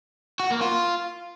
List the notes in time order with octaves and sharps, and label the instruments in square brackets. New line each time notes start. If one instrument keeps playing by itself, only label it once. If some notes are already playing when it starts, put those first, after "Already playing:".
[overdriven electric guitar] F#4
A#3
F4